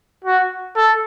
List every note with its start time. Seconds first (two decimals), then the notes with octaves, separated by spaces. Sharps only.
0.25 F#4
0.76 A4